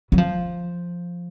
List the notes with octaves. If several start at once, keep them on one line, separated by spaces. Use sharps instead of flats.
F#3
F3